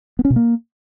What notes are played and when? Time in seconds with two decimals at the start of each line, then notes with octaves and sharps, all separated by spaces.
0.19 B3
0.25 C#4
0.30 B2
0.36 A#3